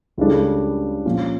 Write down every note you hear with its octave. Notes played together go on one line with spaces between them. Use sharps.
C#2 C#3 G3 D4 A4
A#2 F3 C#4 F4